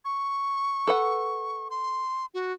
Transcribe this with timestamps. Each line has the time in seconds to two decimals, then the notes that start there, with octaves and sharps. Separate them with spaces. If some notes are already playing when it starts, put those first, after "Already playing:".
0.05 C#6
0.87 A4 B4 F#5
1.70 C6
2.34 F#4